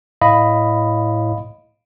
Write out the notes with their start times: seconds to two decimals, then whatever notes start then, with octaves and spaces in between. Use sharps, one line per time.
0.21 A2 D#5 F5 B5